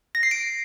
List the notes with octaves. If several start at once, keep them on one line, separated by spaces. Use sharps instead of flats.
A#6
C7
D7